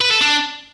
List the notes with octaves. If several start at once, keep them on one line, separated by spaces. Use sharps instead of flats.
B4
A4
D4